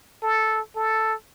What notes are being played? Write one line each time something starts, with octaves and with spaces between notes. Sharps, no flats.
A4
A4